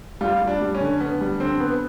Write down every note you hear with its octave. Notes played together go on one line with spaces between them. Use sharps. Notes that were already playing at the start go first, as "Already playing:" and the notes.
G3 F4
G3
D4
G3
C#4
D3
D3 B3
G3
D3 C4
B3